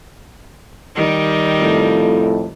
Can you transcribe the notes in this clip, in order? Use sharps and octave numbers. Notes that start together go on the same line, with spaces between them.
D#3 G3
F2 A2